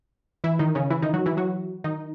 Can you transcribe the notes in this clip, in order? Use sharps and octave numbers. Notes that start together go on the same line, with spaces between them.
E3 E4
D#3 D#4
C#3 C#4
E3 E4
D#3 D#4
F#3 F#4
E3 E4
F#3 F#4
D#3 D#4